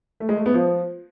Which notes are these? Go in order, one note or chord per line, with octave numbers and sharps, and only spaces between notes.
A3
G#3
A3
B3
F3